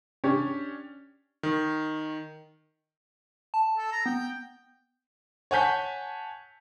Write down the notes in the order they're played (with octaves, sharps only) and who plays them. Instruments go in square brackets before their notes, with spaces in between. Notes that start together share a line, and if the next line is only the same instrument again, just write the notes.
[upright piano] C#4 D4 G4 C#5
[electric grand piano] D#3
[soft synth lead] A5
[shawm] A4
A#5
[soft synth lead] B3 [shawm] G5
[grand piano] C#5 F#5 G#5 A5 G6 B6